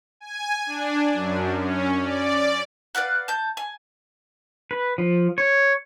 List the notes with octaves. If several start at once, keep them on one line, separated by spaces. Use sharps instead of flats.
G#5
D4
F#2
C#4
D5
B4 D5 F5 F#5
A5 G6
G#5
B4
F3
C#5